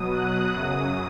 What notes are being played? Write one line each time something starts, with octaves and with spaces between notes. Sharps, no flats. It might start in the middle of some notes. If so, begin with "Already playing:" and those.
Already playing: B2 F#3 D#6
F#6
F#2 C#3 F#3 D#6